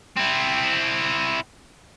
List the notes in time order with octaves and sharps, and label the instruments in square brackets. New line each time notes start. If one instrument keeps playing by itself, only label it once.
[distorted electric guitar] C4 E4